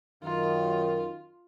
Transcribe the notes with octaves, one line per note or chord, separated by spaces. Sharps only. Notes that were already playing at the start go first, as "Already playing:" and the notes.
F#2 D#3 F4